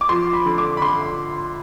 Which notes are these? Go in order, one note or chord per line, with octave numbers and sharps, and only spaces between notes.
D6
F3 C6
B5
D3
D6
B5
D3 C6